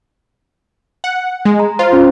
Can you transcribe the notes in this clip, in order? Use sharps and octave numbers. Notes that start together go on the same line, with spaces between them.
F#5
G#3
A#5
F4 C5
C#4